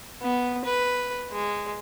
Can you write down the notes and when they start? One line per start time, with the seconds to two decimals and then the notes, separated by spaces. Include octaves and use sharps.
0.22 B3
0.65 B4
1.32 G#3